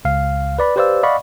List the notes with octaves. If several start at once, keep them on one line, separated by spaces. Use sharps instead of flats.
C#2 F5
B4 D5 B5
G4 B4 C5 D5 F5 E6
D5 D#5 F5 F#5 B5 C#6